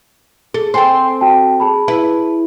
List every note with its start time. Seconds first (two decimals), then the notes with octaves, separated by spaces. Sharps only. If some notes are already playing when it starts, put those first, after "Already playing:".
0.54 G#4 A4
0.74 C4 A4 C5 G5 G#5 C6
1.21 F#4 G5 A5
1.60 G#4 A5 B5
1.88 E4 B4